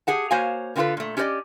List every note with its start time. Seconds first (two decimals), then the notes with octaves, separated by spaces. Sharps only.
0.07 G4 G#4 F#5 A5
0.31 A#3 F#4 C5 C#5 F5 G#5
0.76 D3 A#3 C4 F4 A4 B4
0.97 A#2 A3
1.17 C#4 G4 A4 B4 D5 D#5